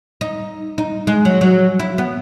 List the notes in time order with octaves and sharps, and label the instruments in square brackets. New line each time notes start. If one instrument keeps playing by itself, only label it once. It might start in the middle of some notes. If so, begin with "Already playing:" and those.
[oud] D#4
D#4
G#3
F#3
F#3
E4
B3